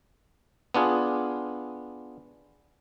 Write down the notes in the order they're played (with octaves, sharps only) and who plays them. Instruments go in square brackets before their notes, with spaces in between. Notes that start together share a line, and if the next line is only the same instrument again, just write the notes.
[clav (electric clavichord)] B3 D4 F4 G#4